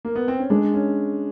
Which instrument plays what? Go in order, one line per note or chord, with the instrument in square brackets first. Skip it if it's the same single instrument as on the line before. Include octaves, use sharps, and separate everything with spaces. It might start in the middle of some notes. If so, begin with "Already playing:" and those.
[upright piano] A#3
B3
C4
C#4
[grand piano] G#3 [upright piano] D4
[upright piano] C#4